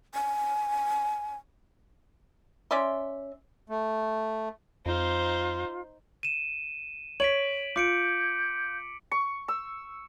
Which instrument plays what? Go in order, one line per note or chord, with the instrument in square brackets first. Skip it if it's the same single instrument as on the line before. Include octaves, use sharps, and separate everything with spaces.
[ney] G#5
[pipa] C#4 D5 E5 C6
[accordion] A3
[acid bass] F2 [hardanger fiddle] D#4 C5 [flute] F4
[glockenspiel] D#7 E7
[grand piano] C#5 [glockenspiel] B6 D7 F#7
[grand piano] F4 [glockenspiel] D6 C#7 D7 [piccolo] G6
[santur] C#6
E6